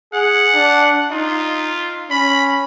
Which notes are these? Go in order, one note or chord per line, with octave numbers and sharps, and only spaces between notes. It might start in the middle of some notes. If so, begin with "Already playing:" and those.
G#4 F#5
D4
D#4 F4
C#4 B5